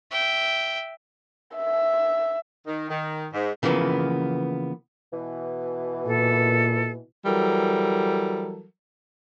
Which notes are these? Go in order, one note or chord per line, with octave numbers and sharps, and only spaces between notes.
E5 G5
E5
D#3
D#3
G#2
C#3 E3 F3 A#3 B3
B2 E3
A#2 A4
E3 F#3 G3 A4 A#4